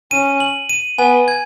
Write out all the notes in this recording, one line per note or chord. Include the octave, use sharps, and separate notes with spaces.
C#4 D#7
F#7
D#7
B3 G#5
G#6